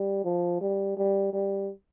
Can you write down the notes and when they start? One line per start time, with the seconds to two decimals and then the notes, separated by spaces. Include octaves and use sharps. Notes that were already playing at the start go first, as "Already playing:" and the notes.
Already playing: G3
0.24 F3
0.61 G3
0.97 G3
1.33 G3